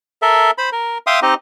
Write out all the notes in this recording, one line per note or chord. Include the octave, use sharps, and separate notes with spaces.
A4 A#4 E5
C5 B5
A#4
E5 F5 G5 C6 D#6
C4 D#4 G4 D#5